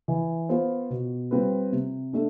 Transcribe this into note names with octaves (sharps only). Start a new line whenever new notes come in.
E3
B3 F4 C5
B2
G3 C4 F4 B4
C3
A3 D4